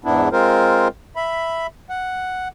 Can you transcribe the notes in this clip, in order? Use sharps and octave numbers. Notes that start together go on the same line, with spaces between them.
E2 G#2 B3 D4 E4
G#3 C4 F4 A#4 C5
E5 B5
F#5